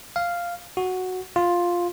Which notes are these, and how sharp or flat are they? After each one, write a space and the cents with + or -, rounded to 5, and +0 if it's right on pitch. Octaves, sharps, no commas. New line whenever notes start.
F5 -5
F#4 -5
F4 +5